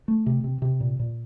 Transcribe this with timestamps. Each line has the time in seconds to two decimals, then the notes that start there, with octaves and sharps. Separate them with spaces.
0.08 A3
0.26 C3
0.44 C3
0.62 C3
0.80 A#2
1.00 A#2